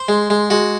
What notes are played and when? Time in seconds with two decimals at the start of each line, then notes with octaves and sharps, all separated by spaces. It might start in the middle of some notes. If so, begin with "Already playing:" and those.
Already playing: C5
0.08 G#3
0.30 G#3
0.50 G#3 F#4